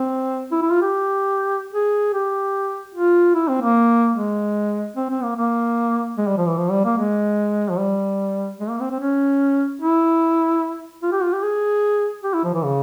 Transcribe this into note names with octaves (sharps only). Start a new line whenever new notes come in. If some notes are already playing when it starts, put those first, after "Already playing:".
Already playing: C4
E4
E4
F4
G4
G#4
G4
F4
E4
C4
A#3
G#3
C4
C4
A#3
A#3
G#3
G3
F3
E3
F3
G3
A#3
G#3
F3
G3
G#3
A#3
C4
C4
C#4
E4
F4
G4
F4
G4
G#4
G4
E4
F3
E3
C#3